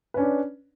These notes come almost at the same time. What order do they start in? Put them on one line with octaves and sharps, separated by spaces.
B4 C#4 D4 D5